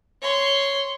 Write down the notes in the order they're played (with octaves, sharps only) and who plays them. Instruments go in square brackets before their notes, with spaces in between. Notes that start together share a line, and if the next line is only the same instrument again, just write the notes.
[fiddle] C#5 C6